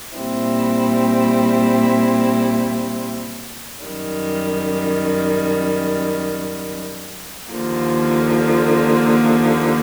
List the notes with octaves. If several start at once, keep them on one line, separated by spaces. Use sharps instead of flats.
A#2 G3 C4 E4
F#2 D#3 G3
D#2 D3 F3 A#3